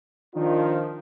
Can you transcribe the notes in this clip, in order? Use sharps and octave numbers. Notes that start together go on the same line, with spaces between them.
D#3 F3 D4 F4